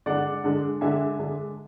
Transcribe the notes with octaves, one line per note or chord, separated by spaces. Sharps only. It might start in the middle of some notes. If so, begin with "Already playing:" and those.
D3 G#3 D4 D5 F#5
D3 G#3 D4
D3 G#3 D4 E5 G#5
D3 G#3 D4